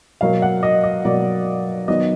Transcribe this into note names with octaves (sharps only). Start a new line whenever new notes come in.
B2 F#3 A#3 F5
F#5
D#5
D#5
B2 F#3 A#3 D5
D#3 F#3 B3 D#5